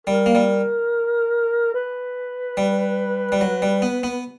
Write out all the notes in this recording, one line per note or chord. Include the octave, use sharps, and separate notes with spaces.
G3 A#4
A#3
G3
B4
G3
G3
F#3
G3
B3
B3